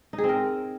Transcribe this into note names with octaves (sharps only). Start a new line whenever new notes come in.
D#4
G#4
C4
A#4